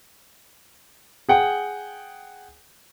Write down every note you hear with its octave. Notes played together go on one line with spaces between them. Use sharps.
G#4 F#5 G5